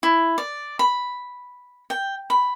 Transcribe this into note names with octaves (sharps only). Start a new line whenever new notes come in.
E4
D5
B5
G5
B5